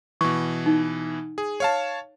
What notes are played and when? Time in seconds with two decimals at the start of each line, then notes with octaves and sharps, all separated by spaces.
0.21 B2 E3 C#6
0.66 D#4
1.38 G#4
1.60 C#5 F5 A5